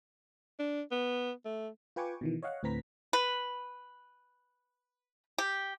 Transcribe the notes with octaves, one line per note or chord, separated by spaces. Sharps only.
D4
B3
A3
F4 B4 G5 G#5 C#6 D6
B2 D#3 E3
C#5 D#5 F5 F#5
D2 A2 C4 B4 A#5 B6
B4
G4